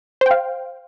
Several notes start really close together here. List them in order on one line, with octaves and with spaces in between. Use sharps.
C5 G5 F5